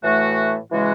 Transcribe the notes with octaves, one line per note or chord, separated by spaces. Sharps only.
A2 E3 A3 F#4
C#3 E3 G#3 F#4